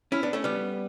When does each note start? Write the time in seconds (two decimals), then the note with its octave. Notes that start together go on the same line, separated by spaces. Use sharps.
0.12 C#4 E4
0.23 B3 D4
0.33 A3 C#4
0.44 G3 B3